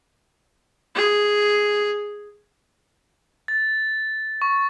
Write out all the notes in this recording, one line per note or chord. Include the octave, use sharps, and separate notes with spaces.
G#4
A6
C#6